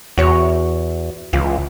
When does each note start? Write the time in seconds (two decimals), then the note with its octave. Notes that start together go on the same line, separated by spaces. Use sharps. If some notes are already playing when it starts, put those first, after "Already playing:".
0.18 E2 F#4 C#5
1.33 C#2 E3 F4